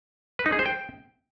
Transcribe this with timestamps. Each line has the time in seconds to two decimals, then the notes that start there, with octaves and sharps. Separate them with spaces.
0.39 B4
0.46 D#4
0.52 G#4
0.59 C5
0.66 G5